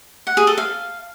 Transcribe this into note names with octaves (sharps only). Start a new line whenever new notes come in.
F#5
G#4
A4
F5